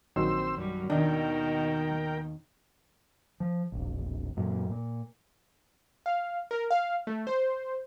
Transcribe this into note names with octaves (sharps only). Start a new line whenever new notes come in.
A#1 D#3 F#3 C4 C5 E6
F#2 G3
D#2 B2 D#3 D4 A#4 D#5 G5
F3
E1 A#1
F#2 A#2
A#2
F5
A#4
F5
A3
C5